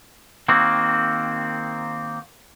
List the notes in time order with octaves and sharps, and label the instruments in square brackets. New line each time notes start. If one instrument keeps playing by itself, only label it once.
[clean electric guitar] D#3 A#3 C4 F#4